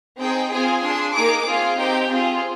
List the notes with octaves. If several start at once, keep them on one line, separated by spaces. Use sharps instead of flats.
C4 D#4 G#4 G5
C4 F4 G#4 G#5
D4 G#4 C6
A#3 D#4 G#4 D6
C4 F4 G#4
C4 D#4 G4 G5
C4 F4 G#4